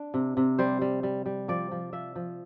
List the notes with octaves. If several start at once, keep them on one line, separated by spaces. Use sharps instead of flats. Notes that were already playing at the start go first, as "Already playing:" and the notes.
Already playing: D4
C3
C3
G3 C5
G3
G3
G3
F3 D5
F3
F3 E5
F3